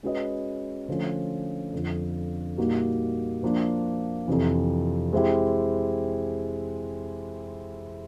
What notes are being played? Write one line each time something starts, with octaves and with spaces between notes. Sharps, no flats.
G#3 C#4 F#4 B4 D#5
D3 F3 A3 C#4
F2 D3 F3
A#2 G3 A#3 D#4 F#4
F3 A#3 D4
F2 C3 E3
G#3 C4 E4 G4